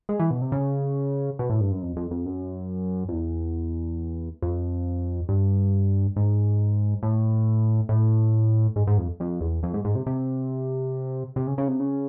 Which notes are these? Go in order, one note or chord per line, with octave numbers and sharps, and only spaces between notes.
G#3
E3
B2
C3
C#3
B2
A2
G2
F#2
F2
F2
F2
F#2
F2
E2
F2
G2
G#2
A2
A2
G#2
G#2
F2
F2
E2
F2
G#2
G#2
C3
C3
C3
C#3
C#3
C3
C#3